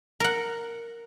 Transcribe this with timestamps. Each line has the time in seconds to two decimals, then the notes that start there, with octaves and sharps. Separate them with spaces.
0.20 A#4 F#5